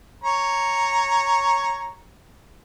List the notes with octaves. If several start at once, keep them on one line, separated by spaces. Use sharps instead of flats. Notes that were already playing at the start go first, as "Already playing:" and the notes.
C#5 A#5